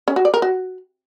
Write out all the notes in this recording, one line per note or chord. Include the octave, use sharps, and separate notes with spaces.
C#4
F#4
D5
A#4
F#4